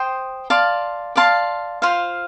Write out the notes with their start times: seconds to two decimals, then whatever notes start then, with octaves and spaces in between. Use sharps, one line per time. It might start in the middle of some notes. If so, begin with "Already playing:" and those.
Already playing: C5 G5 C6 D#6
0.50 D5 F5 A5 C6
1.16 D5 F5 A5 C6
1.82 F4 C5 F5